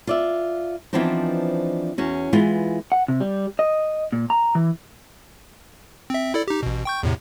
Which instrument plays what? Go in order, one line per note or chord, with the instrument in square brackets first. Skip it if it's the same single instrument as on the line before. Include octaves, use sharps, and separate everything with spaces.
[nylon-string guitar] F4 D5 E5
E3 F3 B3 C4 D4 D#4
E2 C#4 F#4
E3 G#3 B3 F4
[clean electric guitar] F#5
C3
G3
D#5
A#2
A#5
E3
[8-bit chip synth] C4 E5
E4 A4 D5
D#4 G4
A1 B2
G5 C#6 G6
E2 A2 C3